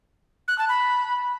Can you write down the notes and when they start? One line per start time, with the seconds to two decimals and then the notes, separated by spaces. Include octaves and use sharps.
0.48 F#6
0.58 A5
0.69 B5